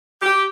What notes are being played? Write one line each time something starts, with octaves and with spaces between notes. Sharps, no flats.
G4